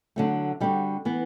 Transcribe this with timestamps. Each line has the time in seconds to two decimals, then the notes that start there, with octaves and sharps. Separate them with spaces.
0.16 D3 F#3 A3
0.60 D3 G3 C4 F#4
1.05 E3 B3